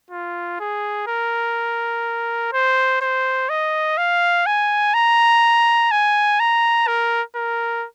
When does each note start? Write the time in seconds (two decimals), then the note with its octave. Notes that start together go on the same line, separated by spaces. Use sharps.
0.11 F4
0.60 G#4
1.07 A#4
2.53 C5
3.01 C5
3.49 D#5
3.97 F5
4.46 G#5
4.94 A#5
5.91 G#5
6.40 A#5
6.87 A#4
7.35 A#4